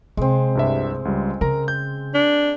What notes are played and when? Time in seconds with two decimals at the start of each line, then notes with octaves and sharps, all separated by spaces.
0.17 C3 G#3 C4
0.55 C2 G2 E5
1.05 C#2 G3
1.41 C#3 A#4 A#5
1.68 G6
2.14 D4